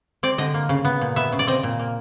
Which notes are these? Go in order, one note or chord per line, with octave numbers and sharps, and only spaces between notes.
C4 D5
D3 D#5
A#3
C#3
B3
A#2
B3 E5
C#3
D5
C4 D#5
A#2
A#3